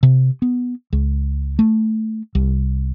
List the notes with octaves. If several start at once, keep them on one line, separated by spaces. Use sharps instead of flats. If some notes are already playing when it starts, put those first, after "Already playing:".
C3
B3
C#2
A3
C2